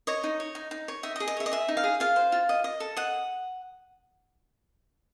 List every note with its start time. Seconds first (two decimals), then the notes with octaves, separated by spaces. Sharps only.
0.07 C#5 D#5
0.24 D#4
0.40 C#5
0.55 D#4
0.71 D#4
0.88 C#5
1.03 D#4 E5
1.16 D#5
1.20 G#4
1.28 D#5
1.37 C#5 E5
1.46 D#5
1.51 G#4 E5
1.68 D#4
1.77 F5
1.84 G#4
2.00 F4 F5
2.16 C5
2.32 F4
2.49 D#5
2.64 D#5
2.80 A4
2.96 D#5 F#5